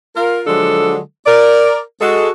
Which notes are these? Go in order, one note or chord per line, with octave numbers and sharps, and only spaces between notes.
F4 A#4
D3 F3 F#3 G#3 D4 A4
A#4 D5
G#3 F#4 A4